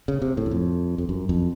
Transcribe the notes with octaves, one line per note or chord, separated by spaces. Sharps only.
C#3
C3
A2
F#2
F2
F2
F#2
F2